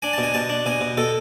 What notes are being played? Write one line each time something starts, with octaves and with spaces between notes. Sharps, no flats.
D4 G#5
B2 A5
G#5
B2 A5
D4
B2 G#5
B2
B2 A4